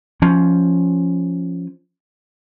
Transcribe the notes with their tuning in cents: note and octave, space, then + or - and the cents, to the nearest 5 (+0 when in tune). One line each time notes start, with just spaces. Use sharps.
F3 +0 C#4 +0